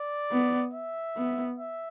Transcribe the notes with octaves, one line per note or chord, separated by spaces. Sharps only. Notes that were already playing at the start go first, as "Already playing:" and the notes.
Already playing: D5
B3
E5
B3
E5